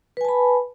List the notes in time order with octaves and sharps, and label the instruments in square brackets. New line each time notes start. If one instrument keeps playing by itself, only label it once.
[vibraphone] B4
G#5
A5
B5